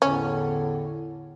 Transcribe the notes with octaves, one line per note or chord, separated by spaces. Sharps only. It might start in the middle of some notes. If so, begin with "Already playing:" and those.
E2 A2 D3 C#4